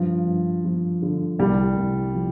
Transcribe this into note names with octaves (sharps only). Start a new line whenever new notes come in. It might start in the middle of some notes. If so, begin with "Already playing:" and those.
Already playing: G2 F3
G2
F3
D3
C2 G3
C2
F3